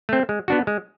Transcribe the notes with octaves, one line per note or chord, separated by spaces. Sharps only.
A3 C4
G#3
B3 D4 F#4
G#3